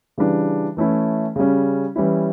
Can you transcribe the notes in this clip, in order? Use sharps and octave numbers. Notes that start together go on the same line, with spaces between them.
C#3 E3 G3 D4
E3 A3 C#4 E4
C#3 G3 C#4
E3 G3 C#4 E4